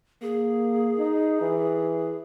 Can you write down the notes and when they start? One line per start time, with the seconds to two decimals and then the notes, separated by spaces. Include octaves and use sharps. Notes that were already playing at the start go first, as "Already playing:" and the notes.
0.22 A#3 G#4
0.99 D#4
1.41 E3